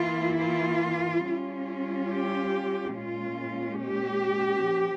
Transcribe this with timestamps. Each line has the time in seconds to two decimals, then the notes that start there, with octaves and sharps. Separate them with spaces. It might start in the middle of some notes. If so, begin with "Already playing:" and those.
Already playing: E3 A#3 E4 F4
0.37 F4
1.24 G3 C#4 F4
2.10 G4
2.96 A#2 G#3 C#4 F4
3.80 G4
4.66 F3